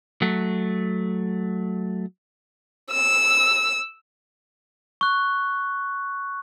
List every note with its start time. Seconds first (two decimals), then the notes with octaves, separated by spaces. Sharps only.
0.22 F#3 A3
2.91 E6
5.01 C#6 F#6